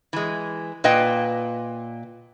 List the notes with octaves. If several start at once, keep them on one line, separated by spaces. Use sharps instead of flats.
E3 G#3
A#2 B4 D#5 G5